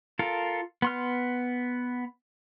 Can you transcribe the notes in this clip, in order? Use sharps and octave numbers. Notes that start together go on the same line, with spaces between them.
F4 A4 A#4
B3 C6 F6